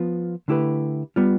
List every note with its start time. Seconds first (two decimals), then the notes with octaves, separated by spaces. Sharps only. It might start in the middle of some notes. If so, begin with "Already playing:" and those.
Already playing: F3 B3 F4
0.48 D3 A3 E4 G4 B4
1.16 G3 B3 F4